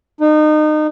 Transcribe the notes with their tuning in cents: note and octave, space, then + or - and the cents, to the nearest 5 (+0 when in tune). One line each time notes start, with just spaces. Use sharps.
D#4 -30